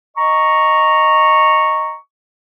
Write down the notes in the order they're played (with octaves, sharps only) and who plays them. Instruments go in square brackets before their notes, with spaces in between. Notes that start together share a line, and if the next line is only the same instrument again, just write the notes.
[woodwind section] D#5 A#5 C#6